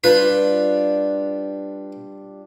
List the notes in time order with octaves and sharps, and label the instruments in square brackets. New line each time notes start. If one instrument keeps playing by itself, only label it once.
[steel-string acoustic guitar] G3 D4 F4 [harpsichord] B4